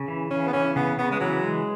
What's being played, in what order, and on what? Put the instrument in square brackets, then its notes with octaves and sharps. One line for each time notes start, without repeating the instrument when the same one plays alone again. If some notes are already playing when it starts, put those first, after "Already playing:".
Already playing: [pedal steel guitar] C#3
E3
[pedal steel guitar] C#3 [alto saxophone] C#4
[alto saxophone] B3
[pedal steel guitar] E3 [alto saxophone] C#4
[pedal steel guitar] C#3 [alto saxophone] B3
[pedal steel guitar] C#3 [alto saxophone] B3
[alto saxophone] G#3
[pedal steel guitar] E3 [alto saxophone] F#3
[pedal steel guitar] G#3